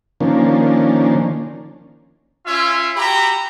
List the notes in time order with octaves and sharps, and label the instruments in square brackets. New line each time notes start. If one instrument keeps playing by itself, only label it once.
[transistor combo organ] D#3 F3 A#3 C#4 D4
[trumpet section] C#4 F4 C#5 E5 F5
F#4 G4 A#5 B5